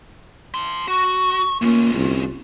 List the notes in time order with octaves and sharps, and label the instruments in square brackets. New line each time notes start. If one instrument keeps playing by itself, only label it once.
[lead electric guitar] A5 C6
[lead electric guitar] F#4 [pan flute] C#6
[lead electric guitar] D2 C#4 [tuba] A#3 [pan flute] F4
[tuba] C2